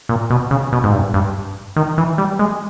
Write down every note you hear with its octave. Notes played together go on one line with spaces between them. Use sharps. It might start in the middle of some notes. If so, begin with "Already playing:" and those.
A#2
B2
C#3
B2
G#2
G2
G2
D#3
E3
G3
G#3